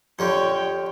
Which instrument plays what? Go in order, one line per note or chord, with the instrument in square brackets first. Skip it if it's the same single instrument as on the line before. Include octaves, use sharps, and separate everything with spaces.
[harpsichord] F2 D3 F3 [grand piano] G4 [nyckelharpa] C#5 G5